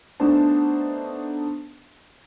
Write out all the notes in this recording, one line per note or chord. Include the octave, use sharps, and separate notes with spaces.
A3 B3 D4 D#4 C5 A5